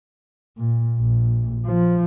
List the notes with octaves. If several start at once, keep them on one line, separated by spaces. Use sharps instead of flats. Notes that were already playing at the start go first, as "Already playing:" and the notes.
A#2
A#1
F3